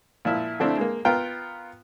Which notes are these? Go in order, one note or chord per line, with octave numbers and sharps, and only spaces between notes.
A#2 F3 E4
D3 F3 A3 C4 D4 E4
G#3 A#3
B3 F4 A#4 G5 A#5